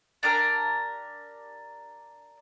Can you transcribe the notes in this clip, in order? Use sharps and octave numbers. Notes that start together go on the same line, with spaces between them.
D4 G4 A#4